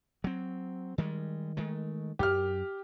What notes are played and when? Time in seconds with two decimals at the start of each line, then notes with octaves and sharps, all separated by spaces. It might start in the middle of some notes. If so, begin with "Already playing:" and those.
0.24 F#3 C4
0.98 D#3 G3 G#3
1.57 D#3 G#3 A3
2.19 F#2 G4 F6